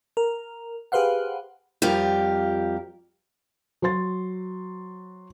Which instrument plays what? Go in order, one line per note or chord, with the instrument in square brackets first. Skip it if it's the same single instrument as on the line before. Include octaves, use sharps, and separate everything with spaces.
[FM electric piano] A#4
G4 G#4 B4 C5 F5 F#5
[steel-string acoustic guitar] F2 G3 F4 G4 A#4
[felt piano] F#3 C5 C6 A6